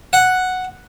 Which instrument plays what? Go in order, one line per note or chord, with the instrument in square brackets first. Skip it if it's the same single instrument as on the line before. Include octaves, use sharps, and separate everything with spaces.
[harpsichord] F#5